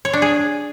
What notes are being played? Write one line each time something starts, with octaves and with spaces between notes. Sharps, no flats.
C#5
D4
G#4